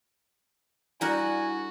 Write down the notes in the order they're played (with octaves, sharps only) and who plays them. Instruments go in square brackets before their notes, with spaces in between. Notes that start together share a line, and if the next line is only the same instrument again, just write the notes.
[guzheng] G3 A#4 F#5 [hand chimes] D4 E4 A4 [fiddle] F#4 [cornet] G#5